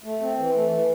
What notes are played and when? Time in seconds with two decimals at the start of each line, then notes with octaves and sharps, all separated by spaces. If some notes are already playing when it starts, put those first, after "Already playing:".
0.04 A3
0.21 C4
0.38 E3
0.55 A3
0.71 E3